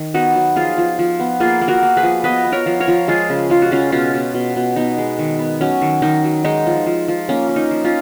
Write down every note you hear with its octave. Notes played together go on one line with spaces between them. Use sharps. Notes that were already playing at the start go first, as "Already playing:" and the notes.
Already playing: D#3
B3 D#4 F#4
F#3
F3 F4 G#4
F3
F3
B3
A#3 F4 G#4
A#3
F#4 A#4
A#3
G#4 B4
F3
B3 B4 D#5
B3
A#4 C#5
F3
A#4 C#5
F3
G#3 F4 G#4
C#3
G#3 F4
F#4
C#3 C#4 F4
B2 C#4 F4
B2
B2
B2
B3 D#4
G#3
D#3
B3
F#3 C#4
D#3
D#3 D#4
F#3
G#3 D#4
F3
F3
F3
A#3 C#4
A#3
D#4
F3
C#4 F4